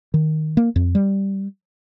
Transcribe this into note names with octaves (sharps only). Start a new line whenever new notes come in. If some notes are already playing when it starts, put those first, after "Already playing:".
D#3
A#3
F2
G3